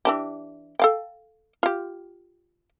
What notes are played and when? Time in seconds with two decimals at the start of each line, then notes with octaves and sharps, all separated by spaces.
0.05 E3 D4 G4
0.79 A4 F5 G5
1.63 F4 G4